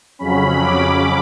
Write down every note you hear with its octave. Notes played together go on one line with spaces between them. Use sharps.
F2 C#3 F#3 C#4 B5
D6